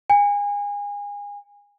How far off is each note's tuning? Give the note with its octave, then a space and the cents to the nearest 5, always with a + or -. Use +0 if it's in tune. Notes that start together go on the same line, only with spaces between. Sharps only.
G#5 -30